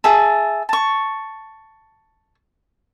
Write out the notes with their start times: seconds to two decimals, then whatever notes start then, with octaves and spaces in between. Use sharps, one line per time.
0.04 G#4 E5 A5
0.69 A5 C#6